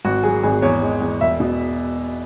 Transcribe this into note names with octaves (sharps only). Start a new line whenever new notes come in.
G#1 F#4
F#3 G#4
G#1 G#4
E2 C#5
G#3
E2
E1 E5
B2